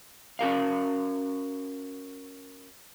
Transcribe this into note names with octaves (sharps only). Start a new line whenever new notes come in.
C#4 F#4 A#4 F5